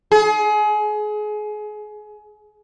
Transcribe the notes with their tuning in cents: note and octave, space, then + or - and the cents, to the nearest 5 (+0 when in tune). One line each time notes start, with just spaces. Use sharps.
G#4 +30